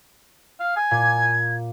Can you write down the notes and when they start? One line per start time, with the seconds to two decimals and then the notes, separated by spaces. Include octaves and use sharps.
0.60 F5
0.76 G#5
0.91 A#2 G#6